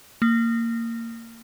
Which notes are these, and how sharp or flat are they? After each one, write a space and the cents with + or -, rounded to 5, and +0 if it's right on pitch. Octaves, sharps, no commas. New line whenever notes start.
A#3 -20